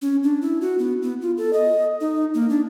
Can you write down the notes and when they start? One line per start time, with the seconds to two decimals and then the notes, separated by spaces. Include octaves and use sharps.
0.02 C#4
0.23 D4
0.42 E4
0.61 F#4
0.79 B3
1.02 B3
1.22 F4
1.37 A4
1.53 D#5
2.01 D#4
2.34 A#3
2.49 D4